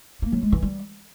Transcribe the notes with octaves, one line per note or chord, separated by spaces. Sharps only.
A#3
F#3
G#3
E3
G3